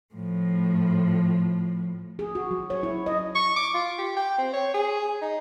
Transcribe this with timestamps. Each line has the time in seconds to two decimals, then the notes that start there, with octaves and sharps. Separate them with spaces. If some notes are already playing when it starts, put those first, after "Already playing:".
0.14 A2 F3
2.19 G#4
2.35 F#4
2.51 F#3
2.70 C#5
2.83 E4
3.06 D#5
3.35 C#6
3.56 D6
3.74 F4
3.98 G4
4.17 G5
4.38 C4
4.53 C#5
4.74 G#4
5.21 D#4